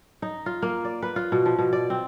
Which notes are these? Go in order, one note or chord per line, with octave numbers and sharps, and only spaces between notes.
D#4
F4
A#3
D5
B4
F4
B2
F3
B2
D5
C4